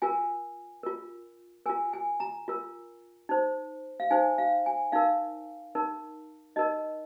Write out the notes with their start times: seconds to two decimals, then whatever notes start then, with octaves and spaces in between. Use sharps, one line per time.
0.02 F4 A#4 G#5
0.83 F4 A#4
1.66 F4 A#4 G#5
1.93 G#5
2.20 A#5
2.48 F4 A#4
3.29 D#4 C5
4.00 F5
4.11 D#4 C5 G#5
4.38 F5
4.66 G#5
4.92 D#4 A#4 F5
5.75 D#4 A#4
6.56 D#4 A#4 D#5